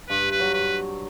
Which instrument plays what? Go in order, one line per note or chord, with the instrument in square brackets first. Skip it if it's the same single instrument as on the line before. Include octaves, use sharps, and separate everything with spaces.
[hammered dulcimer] G2 [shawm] B4
[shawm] B4
[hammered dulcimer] F#3
[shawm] B4